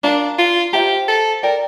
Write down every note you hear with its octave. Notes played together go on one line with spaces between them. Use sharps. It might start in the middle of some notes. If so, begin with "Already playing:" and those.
D4 A#4 D5 F5 A#5
F4
F4 G4 C5 E5 A#5
A4
A4 A#4 D5 G5